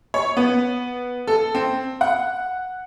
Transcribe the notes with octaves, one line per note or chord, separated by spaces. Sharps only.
C#5
B3
A4
C4
F#5